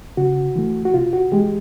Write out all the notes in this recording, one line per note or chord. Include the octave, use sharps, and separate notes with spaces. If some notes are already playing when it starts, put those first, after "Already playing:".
C#3 F#4
E3 A3
F#4
C3 F4
F#4
E3 G#3 G4